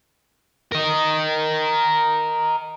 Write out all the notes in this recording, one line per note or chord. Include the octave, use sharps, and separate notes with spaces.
A#4 D#5